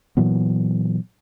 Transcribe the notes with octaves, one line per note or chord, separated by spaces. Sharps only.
A#2 E3 F#3 B3